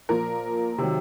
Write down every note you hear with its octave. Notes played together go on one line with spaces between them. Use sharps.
A#2 F3 A#4
C3 D#3 F#3